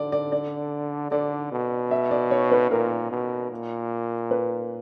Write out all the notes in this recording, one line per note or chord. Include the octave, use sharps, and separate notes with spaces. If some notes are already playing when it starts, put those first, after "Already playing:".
Already playing: D3 D5
D5
D5
D3 D5
B2
E5
D5
C#5
B4
A#2 A#4
B2
A#2
B4